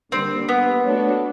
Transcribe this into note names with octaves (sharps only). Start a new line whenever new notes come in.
D3 G3 A#3 C4
B3
A3 D4 F#4 A4 C#5